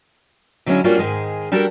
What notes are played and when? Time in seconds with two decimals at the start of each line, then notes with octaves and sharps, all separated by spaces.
0.66 D3 F#3 G#3 C4 C#4 E4
0.84 G3 A#3 C#4 D4 F4 F#4
0.98 G#2 D#3 G#3 G#4
1.52 G3 D4 F#4 G4 A4 A#4